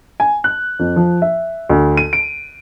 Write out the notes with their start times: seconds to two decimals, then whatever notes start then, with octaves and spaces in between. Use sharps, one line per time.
0.20 G#5
0.44 F#6
0.79 F2
0.96 F3
1.22 E5
1.69 D2
1.97 D#7
2.13 D7